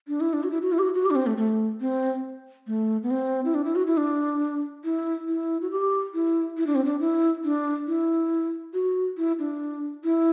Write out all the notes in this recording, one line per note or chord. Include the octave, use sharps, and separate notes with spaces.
D4
E4
D4
F#4
E4
F#4
E4
G4
F#4
F#4
G4
D4
C4
A3
A3
C4
A3
B3
C4
E4
D4
E4
F#4
E4
D4
E4
E4
F#4
G4
E4
E4
D4
C4
D4
E4
D4
E4
F#4
E4
D4
E4